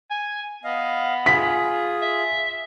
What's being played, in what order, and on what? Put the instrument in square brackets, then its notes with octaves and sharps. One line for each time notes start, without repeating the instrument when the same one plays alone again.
[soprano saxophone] G#5
[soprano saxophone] B3 [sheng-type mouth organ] D#5 F5
[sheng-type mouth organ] F4 G#4 [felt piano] B6
[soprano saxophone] E5